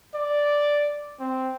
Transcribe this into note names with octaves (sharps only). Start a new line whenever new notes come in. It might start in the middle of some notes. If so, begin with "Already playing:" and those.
D5
C4